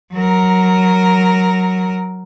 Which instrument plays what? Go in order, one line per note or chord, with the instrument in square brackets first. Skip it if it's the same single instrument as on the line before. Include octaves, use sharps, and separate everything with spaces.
[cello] F#3 A#4